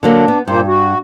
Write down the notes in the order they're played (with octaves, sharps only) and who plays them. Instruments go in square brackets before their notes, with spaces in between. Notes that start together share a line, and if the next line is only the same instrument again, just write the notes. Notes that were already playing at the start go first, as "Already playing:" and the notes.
[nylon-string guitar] D3 F#3 A#3 [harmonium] D4
[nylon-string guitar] B3
[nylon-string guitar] G2 [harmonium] A#2 A#3 C5
[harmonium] F#4